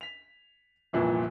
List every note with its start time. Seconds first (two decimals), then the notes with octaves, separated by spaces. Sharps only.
0.01 B6 F7
0.93 G1 C2 F2 A#2 E3 F3